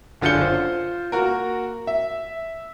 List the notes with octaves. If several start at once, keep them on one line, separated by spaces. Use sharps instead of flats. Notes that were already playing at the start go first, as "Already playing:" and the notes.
F#1 D3 F4 G6 C#7 G7
F4 C5
A#3 F#4 A#4
E5